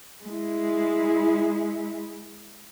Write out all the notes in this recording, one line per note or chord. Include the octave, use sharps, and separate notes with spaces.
G#3 E4